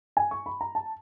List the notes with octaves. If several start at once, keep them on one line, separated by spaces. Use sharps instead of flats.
G#5
C#6
B5
A#5
A5